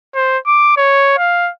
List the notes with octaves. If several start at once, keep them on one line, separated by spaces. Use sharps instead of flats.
C5
D6
C#5
F5